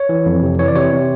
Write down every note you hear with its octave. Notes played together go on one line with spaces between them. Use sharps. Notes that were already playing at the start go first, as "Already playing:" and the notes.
Already playing: C#5
E3
F2
C3
E3 C#5
D5
C3 C#5
C3